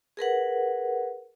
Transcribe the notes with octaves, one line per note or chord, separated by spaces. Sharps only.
G#4 A#4 B4 F#5